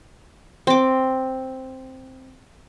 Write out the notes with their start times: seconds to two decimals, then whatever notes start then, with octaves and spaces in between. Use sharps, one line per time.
0.67 C4 D6